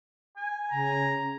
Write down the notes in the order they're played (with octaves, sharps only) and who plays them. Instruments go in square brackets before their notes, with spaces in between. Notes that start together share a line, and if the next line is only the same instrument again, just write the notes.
[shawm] G#5
[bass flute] C#3 [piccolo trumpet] A#5